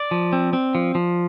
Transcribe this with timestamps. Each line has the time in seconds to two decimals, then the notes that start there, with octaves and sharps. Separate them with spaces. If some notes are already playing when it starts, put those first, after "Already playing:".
Already playing: D5
0.11 F3
0.33 C4
0.53 C4
0.75 F3
0.95 F3